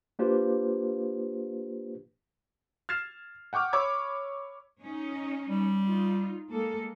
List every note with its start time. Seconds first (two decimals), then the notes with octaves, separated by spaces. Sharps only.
0.19 A#3 D4 F4 G4 B4 C5
2.89 F6 G#6 A6 C7 E7
3.53 F#5 G5 C#6 D6 F6
3.73 C#5 B5 C#6 D6 E6 G#6
4.81 C#4 D#4
5.49 G3
5.83 D#4 F4
6.52 G#3 A#3 A4